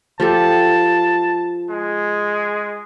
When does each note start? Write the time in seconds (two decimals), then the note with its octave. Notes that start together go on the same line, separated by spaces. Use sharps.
0.20 F3 G4 A4 A5
1.70 G#3